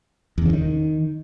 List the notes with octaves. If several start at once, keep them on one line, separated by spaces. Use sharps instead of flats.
E2
C#3
D#3